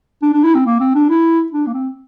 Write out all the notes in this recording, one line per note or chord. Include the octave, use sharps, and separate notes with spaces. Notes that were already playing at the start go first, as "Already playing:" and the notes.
D4
D4
E4
C4
A#3
C4
D4
E4
D4
A#3
C4